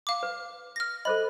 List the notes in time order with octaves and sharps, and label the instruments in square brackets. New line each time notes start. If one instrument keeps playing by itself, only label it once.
[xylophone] F5 D6
[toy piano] B4
[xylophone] F6 A#6
[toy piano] A4 C5 D#5 [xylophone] B5